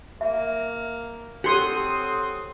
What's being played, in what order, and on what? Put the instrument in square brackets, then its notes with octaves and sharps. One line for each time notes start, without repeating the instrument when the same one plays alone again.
[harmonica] A#3 [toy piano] E5
[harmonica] C4 [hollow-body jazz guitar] G4 A4 C#5 [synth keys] F#5 C6 D#6